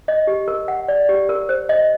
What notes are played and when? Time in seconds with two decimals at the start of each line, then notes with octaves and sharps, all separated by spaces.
0.08 D#5
0.27 G4
0.48 A#4
0.68 F#5
0.88 D5
1.09 G4
1.29 A#4
1.49 C5
1.69 D#5